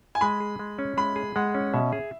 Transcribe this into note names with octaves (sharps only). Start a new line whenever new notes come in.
G#5
G#3 B5
G#4
G#3
C#4
G#3 B5
G#4
G#3 F#5
C#4
B2 E5
G#4